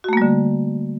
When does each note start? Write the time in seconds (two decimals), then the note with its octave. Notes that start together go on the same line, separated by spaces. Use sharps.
0.04 F#4
0.09 A3
0.13 A#3
0.17 G3
0.22 D3